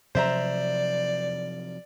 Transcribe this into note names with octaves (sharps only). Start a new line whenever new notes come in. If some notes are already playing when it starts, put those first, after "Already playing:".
C3 F3 F#3 C5 D5 E5 A#5